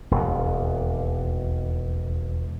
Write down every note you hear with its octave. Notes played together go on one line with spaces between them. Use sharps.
E1 D#2